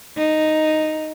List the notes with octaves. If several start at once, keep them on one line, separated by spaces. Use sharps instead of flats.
D#4